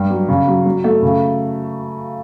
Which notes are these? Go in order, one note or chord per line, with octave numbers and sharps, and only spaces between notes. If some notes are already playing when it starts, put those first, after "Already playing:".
Already playing: G2 G3
F#3
C#3
F#3
F#3
A3
C#3